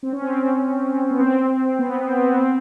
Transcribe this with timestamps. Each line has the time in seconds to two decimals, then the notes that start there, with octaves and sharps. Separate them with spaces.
0.03 C4
0.13 C#4
0.22 C4
1.11 B3
1.20 C4
1.79 B3
1.98 C4
2.11 C4
2.18 B3
2.37 C4